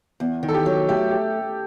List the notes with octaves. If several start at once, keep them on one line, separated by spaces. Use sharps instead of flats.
E2
D#3
A4
G4
F#3
A3 G4
G4